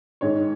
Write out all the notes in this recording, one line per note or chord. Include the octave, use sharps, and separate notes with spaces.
G#2 D#3 G#3 C#5